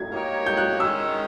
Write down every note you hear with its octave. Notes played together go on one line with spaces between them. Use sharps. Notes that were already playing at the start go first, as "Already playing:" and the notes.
Already playing: G#6
A#3 D#4 G4 A#4 C#5
G6
F#6
D#3 G#3 C#4 E6